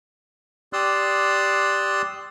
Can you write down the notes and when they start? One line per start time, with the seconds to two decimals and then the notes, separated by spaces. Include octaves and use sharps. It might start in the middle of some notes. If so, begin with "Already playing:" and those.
0.73 G4 D5 C6 D#6 E6 F#6